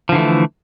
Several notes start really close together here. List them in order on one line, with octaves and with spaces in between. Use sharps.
F3 D3 E3 A3